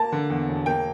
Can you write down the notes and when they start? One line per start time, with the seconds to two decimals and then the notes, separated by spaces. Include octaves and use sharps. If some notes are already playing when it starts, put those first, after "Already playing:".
Already playing: A#3 A5
0.12 D3
0.30 E2
0.49 E1
0.66 A#3 G5